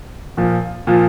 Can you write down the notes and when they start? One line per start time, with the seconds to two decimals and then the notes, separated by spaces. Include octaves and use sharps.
0.37 A#2 F3
0.87 A#2 F3